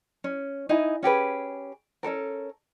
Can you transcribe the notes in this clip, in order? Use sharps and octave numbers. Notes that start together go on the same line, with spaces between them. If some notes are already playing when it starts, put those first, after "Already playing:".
C#4
D#4 E4 G#5
C#4 G4 G#4 B4
C#4 D4 A4 A#4